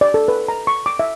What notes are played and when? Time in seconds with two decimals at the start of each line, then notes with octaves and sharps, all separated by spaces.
0.01 D5
0.14 A4
0.28 B4
0.48 A#5
0.67 C#6
0.86 D6
0.99 E5